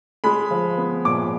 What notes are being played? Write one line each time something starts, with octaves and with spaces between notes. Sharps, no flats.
G#3 B5
F3
B3
A#2 D6